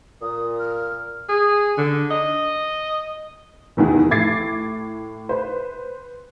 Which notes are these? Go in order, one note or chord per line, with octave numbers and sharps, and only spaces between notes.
A#2 D#6
F6
G#4
D3
D#5
F1 E2 D#3 E3
A2 D6 G#6 A6 C7
B4 C5